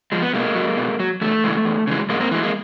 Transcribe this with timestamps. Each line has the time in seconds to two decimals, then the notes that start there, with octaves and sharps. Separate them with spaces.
0.12 F3 G#3
0.22 B3
0.34 B2 G#3 A#3
0.55 F#3
0.77 B2
1.00 F#3
1.21 E2 A3
1.44 C#3 E3 G#3
1.65 E2
1.87 C#3 E3 G#3
2.09 G#2 G#3 A#3
2.20 A#3 C4
2.31 E3 G#3
2.43 G#3 A#3